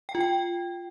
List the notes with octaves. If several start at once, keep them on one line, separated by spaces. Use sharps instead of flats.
G5
F4
G5